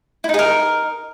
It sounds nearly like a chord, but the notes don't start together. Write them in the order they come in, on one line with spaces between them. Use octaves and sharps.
E4 D#4 G#4 A#4